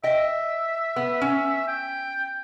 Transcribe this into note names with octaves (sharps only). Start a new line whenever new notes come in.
D#5 E5 G5
B3
C#4
G5